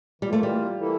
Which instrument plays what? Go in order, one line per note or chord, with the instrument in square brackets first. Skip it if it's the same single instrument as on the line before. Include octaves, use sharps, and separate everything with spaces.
[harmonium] E3 A#3 F4 [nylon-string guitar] G3
[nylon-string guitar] A3
G3
[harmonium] E3 A#3 E4 A4